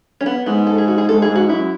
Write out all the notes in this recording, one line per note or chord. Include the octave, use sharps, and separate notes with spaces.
C#4
B3
G#2 B3
A4
G#4
F#4
G#4
G#2 A4
G#4
G#2
F#4
F#2 E4